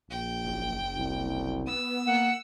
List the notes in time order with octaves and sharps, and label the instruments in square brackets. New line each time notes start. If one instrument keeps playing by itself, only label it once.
[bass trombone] A#1 [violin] G5
[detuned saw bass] F#1
[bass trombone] C2
[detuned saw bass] B3 [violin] E6
[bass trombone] A#3 [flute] F#5